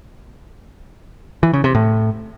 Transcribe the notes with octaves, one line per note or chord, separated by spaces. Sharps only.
E3
C#3
C3
A2